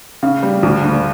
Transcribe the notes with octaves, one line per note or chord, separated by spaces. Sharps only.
C#3
G3
D2
D3